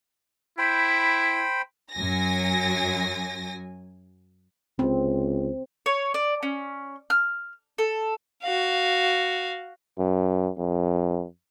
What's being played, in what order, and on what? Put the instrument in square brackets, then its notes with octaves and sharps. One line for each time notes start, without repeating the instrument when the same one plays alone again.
[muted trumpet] E4 [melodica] C5 G5 B5
[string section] F#2 F#3 G#5 A#6
[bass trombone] C#2 [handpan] C4
[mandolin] C#5
D5
C#4
F6
A4
[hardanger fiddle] F#4 F5
[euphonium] F#2
F2